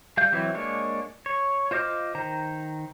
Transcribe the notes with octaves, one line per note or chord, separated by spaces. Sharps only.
G3 F5 G6
E3 F#3 C4 E4
G#3 A#3 D4 C#5
C#5
F4 C5 D#5 D6 F6
D#3 C5 A#5